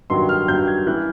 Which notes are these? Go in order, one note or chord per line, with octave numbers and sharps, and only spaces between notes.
G2 D#3 F#3 C6
F6
G2 D#3 F#3 G6
G#6
E3 F#6